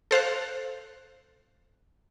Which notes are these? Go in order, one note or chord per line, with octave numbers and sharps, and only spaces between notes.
A4 C5 F5 F#6